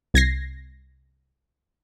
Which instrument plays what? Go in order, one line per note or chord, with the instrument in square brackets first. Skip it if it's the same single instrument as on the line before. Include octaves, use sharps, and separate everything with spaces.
[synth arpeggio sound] C2 G#6 A#6 C7